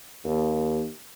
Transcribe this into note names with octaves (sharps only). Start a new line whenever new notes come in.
D#2